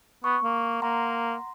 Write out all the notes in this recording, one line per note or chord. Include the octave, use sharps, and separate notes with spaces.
B3 C#6
A#3
A#3 F#5 A#5 C6